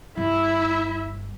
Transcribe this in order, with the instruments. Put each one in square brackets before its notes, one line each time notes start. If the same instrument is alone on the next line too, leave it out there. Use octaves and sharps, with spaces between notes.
[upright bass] G1 [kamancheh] E4 E5